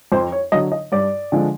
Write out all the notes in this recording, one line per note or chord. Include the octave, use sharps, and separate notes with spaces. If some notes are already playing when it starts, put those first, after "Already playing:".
F2 C5
C#5
D3 F#3 D#5
D#5
G2 D5
D3 F3 G#3